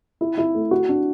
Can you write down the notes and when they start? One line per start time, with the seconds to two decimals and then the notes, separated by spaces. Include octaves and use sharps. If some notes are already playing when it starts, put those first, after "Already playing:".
0.21 E4
0.38 E4
0.54 A3
0.71 F#4
0.89 D4